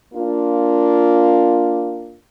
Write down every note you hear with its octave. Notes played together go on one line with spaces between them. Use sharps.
A#3 D4 F4